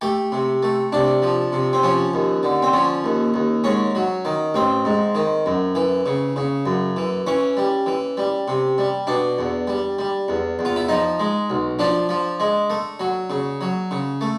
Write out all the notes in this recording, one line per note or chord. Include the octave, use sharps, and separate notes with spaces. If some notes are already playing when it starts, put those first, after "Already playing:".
A3 G4
C3
A3
C3 D4
F3
C3
C4
F3 C#4
D#2
D3
C4
F3 C#4
D#2
D#2
G#2 C#4
F#3
D#3
A1 C4
G#2
D#3
F#2
E3
C#3
C#3
F#2
E3
E3 C#4
G3
E3
G3
C3
G3
B2 D4
E2
G3
G3
E2
E2
F4
E4
F3 D#4
G#3
B1
F3 D4
F3
G#3
A3
F#3
C#3
F#3
C#3
A3